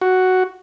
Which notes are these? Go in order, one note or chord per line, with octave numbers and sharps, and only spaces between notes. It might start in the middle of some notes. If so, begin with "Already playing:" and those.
F#4